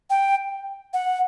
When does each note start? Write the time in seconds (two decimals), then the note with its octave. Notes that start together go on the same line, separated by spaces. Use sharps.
0.10 G5
0.94 F#5